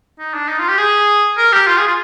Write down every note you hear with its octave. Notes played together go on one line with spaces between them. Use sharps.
D#4
D4
D#4
F4
G4
G#4
A#4
G4
F4
G#4
F4